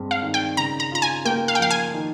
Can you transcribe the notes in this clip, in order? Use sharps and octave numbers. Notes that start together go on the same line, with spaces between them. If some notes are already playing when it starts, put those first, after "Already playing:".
Already playing: G2 G#3 C4
F5
D#3
G5
C#3 A#5
A#5
F4 A#5
G#5
A#3 G5
F5
G5
F3 F5
G#5
D#3